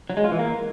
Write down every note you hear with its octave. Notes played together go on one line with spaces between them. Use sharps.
F#3
G#3
F4
E3
A#3